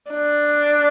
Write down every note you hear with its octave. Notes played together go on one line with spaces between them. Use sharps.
D4